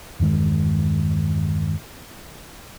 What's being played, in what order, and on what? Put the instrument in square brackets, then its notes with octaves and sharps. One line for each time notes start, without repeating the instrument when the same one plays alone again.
[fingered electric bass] E2 G2 D#3 G#3